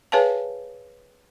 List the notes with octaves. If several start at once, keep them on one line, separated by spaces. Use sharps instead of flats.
G#4 B4 C#5 F5 G#5 A5